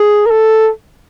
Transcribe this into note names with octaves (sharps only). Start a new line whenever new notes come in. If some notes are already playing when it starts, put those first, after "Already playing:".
Already playing: G#4
A#4
A4